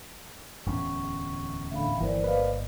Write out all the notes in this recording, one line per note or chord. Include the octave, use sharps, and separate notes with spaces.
D1 E2 C#4 C#6
A2 D3 E5 F5 B5
G1 E3 A#3 A#4 C5 D5
B4 D#5 F5